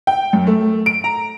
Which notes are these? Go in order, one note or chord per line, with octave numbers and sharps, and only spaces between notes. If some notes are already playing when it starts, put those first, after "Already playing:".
G5
F#2
A3
D7
A#5